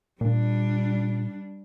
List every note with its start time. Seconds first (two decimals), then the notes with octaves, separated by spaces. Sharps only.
0.21 A#2 G3 D4